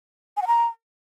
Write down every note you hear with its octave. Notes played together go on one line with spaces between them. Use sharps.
G#5
F#5
A#5